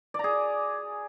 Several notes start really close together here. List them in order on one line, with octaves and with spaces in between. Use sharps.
D5 A#5 G#4